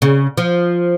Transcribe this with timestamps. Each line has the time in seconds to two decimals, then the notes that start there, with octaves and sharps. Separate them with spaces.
0.02 C#3
0.37 F3